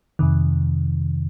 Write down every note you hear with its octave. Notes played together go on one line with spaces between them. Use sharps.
F2 C3 D#3